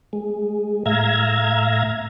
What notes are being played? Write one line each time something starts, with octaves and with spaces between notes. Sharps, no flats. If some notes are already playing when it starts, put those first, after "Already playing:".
G#3
A2 E5 F5 A#5 G#6